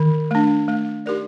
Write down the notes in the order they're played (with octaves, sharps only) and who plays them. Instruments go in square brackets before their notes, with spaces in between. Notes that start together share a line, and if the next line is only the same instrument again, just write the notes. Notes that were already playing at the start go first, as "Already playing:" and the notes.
Already playing: [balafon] D#3
A3 D4
A3
D#4 G4 A#4 D5